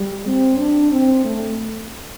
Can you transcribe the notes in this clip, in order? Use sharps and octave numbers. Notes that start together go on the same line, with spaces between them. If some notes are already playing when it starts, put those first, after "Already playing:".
Already playing: G3
C4
D4
C4
A3